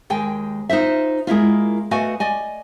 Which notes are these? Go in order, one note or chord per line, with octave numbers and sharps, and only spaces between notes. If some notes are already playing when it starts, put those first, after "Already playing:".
D#2 G#3 G5 G#5
D#4 F4 C5 E5
G#3 A#3 E4 F4
A3 F#4 B4 D#5 F5 G#5
D5 D#5 G#5